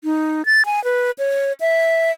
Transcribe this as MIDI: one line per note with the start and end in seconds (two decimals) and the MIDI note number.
0.04 0.45 63
0.46 0.65 93
0.66 0.83 80
0.84 1.11 71
1.18 1.53 73
1.60 2.11 76